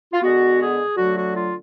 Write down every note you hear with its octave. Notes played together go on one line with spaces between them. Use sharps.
F4
D3 G#3 B3 F#4
G#4
D3 F#3 A3 F#4
F#4
F4